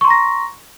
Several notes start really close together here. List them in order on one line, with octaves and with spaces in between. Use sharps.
C#6 C6 A#5 A#6